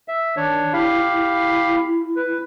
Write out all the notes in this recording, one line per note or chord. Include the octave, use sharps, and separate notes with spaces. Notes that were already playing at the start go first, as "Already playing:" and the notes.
E5
D#3 D4 C#5
E4 G4 F5 B5
E4
B4